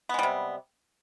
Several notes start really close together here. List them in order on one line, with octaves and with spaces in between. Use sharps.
B3 G#3 G3 C3